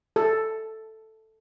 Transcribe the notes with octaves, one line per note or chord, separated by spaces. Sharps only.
A4